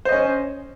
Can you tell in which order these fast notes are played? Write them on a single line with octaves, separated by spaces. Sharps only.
C5 D#5 C#4